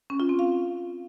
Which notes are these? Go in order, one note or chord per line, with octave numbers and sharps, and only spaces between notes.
C#4
F4
C4
F5